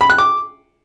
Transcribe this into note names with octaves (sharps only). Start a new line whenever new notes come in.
B5
F#6
D6